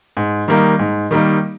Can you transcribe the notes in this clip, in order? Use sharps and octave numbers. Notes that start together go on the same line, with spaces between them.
G#2
D#3 G3 A#3 D#4
G#2
D#3 G3 A#3 D#4